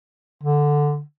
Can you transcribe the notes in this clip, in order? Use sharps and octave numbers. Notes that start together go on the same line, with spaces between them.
D3